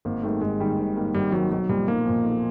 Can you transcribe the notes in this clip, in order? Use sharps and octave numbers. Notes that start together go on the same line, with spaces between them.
G#1 A#3
G#2 D#3 G3 A3 A#3
G#1 G#3
G#2 D#3 G3 A#3
G#1
G#2 D#3 G3 A#3
G#1 G3
G#2 D#3 F#3 G3 A#3
B1 F#3
A#2 F3 G3
B1 A#3
A#2 F3
B1